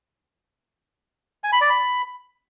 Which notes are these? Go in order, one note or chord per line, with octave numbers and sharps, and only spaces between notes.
G#5
B5
D5
B5